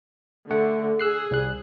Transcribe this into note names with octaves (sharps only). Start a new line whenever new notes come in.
D3 A3 F#5
G#4 E6 F#6 C7
C2 G3 F#6